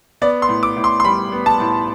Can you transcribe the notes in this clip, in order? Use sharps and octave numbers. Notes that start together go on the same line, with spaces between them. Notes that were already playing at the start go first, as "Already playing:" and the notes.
B3 D5
C6
A2
D6
A2
C6
C6
G3 B5
B3
A5
A2